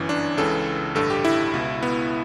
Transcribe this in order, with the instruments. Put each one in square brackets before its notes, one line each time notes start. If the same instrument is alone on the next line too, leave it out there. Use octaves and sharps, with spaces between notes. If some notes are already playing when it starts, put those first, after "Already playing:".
Already playing: [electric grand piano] G1 F#2 E3 C#4
D4
C#2 C#3 E3 A4
A1 G2 D3 A4
G4
E4
C#2 B2
B3